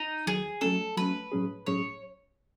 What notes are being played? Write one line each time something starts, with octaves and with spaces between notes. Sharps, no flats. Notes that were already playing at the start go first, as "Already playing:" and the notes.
Already playing: D#4
D#2 D#3 F#3 G#4
F#3 A3 C#4 A4
F#3 A3 C#4 B4
A2 F#3 C#4 G#4
A2 F#3 C#4 G#4 C#5